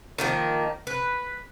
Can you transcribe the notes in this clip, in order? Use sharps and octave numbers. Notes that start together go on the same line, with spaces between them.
D#3 F3 A#3
B4